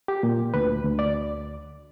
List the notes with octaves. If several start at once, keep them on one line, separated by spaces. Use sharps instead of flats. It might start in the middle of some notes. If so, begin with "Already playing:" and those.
G4
A#2
D2 B4
D2
D5